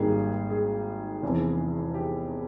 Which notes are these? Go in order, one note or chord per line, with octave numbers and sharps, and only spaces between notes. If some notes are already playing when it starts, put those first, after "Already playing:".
Already playing: G#1 G#2 G3 A#3 G#4
G#4
F1 E2 E3
G4